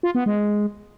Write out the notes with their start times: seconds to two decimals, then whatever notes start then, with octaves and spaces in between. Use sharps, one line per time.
0.03 F4
0.15 B3
0.26 G#3